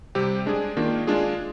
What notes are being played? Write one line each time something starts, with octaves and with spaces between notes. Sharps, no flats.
C3 G3 C4 G4
G#3 D4 G#4
D#3 A#3 D4 F4
G#3 D4 F4 G#4